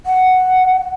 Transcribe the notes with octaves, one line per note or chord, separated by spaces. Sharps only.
F#5